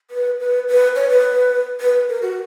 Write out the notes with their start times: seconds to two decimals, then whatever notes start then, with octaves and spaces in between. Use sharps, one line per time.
0.11 B4
0.40 B4
0.68 B4
0.96 C#5
1.10 B4
1.81 B4
2.09 A#4
2.22 F#4